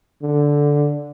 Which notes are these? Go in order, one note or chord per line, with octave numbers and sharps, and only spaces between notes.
D3